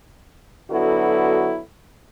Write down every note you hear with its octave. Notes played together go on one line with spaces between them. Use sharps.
D3 F#3 B3 E4 F#4 A4